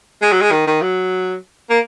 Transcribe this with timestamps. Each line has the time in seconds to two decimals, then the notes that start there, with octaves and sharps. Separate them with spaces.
0.22 G#3
0.32 F#3
0.41 G#3
0.51 D#3
0.67 D#3
0.82 F#3
1.70 A#3